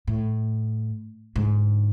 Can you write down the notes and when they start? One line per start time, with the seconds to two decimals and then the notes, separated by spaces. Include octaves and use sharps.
0.07 A2
1.36 G#2 D3